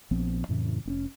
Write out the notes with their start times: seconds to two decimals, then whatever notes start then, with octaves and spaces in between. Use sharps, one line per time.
0.11 A#1 F3 B3 C4
0.49 F2 A2 C#3 E3
0.85 F1 C4 C#4